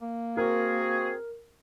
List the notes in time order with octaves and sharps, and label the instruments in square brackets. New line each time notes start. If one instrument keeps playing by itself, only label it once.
[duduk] A#3
[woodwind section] C4 F#4 G#4 [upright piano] A#4